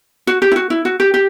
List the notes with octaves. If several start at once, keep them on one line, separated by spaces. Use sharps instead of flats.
F#4
G4
E4
F#4
E4
F#4
G4
G4